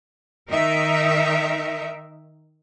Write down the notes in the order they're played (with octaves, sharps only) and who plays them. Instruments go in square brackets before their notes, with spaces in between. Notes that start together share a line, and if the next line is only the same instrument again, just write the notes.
[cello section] D#3 D#4 A#4 E5